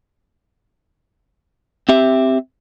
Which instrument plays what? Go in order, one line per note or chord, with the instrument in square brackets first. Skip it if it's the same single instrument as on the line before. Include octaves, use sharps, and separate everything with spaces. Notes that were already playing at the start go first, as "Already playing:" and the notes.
[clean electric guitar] C4 G4 E5